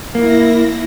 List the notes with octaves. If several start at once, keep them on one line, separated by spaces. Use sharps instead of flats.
A#3 E4 A#6